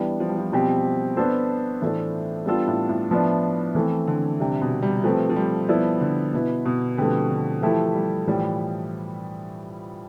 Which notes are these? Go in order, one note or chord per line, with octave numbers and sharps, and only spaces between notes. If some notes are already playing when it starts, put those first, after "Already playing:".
Already playing: E3 G3 B3 D4
F3
G3
F3
B2 F3 G3 C4 G4
B3 D4 A4 C5
A2 E3 A3 D4 A4 C5
G3 B3 D4 F4 A4
A2
A2
F3 B3 D4
E3 A3 C4
D3
C3 G3 D4 G4
B2
G3
F3 A3 C4 G4 B4
F3
G3
F3 B3 E4 A4 D5
D3
B2 B3 E4 B4
B2
D3 F3 A3 C4 G4 B4
D3
E3 F3 A3 E4 G4
G3
A2 E3 F3 G3